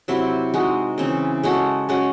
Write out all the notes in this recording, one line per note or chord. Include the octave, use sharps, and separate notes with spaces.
C3 F#3 C4 E4
G#3 D#4 F#4
C#3 E3 C4
G#3 C#4 F#4 A4
G#3 C#4 F#4